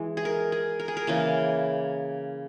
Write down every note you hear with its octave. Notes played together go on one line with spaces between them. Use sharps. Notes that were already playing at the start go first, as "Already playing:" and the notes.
Already playing: E3 G#3
G#4
A#4
G#4
A#4
G#4
A#4
C#3 E3 A#3